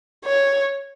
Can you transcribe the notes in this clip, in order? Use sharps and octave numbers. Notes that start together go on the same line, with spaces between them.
C#5